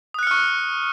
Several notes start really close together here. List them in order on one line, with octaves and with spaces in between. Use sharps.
D#6 F#6 C#7 F6 C#6